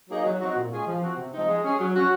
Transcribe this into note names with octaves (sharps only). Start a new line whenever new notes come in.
F#3 A#3 D#4 G#4
F#3
C4 D#4 F#4
A#2
G#3 C#4 F4 G#4
F3
C4 F#4
C3
F3 G#3 C4 D#4
G#3
C#4 G#4
F#3
C#4 F#4